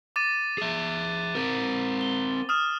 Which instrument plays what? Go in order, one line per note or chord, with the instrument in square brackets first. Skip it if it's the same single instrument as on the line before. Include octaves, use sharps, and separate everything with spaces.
[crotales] D6 A6 D#7
[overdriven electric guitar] G#4 E5
C4 A#4
[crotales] G7
D#6 F6 E7